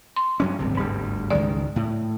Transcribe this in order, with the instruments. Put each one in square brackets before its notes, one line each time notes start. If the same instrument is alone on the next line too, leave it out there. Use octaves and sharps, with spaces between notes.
[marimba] C6
[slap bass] G2 F#3 C#4
D1 G#1 C3
[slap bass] G1 D2 G3 [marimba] G#2
[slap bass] C#2 D#3 G#3 [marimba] D5
[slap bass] A2